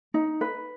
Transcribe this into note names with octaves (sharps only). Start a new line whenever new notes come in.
D#4
B4